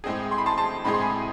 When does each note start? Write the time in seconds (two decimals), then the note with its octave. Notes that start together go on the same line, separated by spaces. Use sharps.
0.04 A2 G#3 C4 G#4
0.31 C6
0.38 B5
0.46 A5 C6
0.58 A5 C6
0.84 A2 G#3 C4 G#4 B5
0.93 C6
1.01 G#5 B5